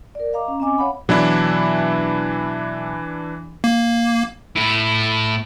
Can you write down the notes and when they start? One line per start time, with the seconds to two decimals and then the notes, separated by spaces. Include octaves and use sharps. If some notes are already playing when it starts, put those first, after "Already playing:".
0.15 A#4 D5
0.33 D#5 F5 A#5 D6
0.45 C#4 A#5
0.60 C4 C#4 D#5 G#5 D6
0.78 C#5 F5 F#5 B5
1.09 B2 E3 F#3 D4 E4
3.64 A#3
4.56 A2 E4